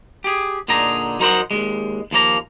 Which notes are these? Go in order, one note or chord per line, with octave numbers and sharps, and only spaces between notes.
G4 G#4
A#2 D3 D#4 G#4 A#5
F#3 D#4 A#4 C5 D#5 F#5
D#2 C3 G#3
D#2 F3 A#3 A#5